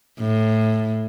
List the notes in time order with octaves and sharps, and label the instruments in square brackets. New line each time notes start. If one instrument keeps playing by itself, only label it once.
[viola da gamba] A2